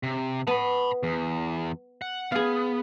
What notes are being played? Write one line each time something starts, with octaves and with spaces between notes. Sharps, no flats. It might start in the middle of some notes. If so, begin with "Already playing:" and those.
C3
B3 A5 B5
E2
F#5
B3 G#4 F5